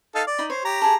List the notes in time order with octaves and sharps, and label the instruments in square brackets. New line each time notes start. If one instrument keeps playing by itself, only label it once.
[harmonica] D#4 A4 F5
D5
[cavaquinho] D#4 B5
[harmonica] C5 [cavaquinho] C#5
[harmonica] G4 A#5
[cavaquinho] G#4 A4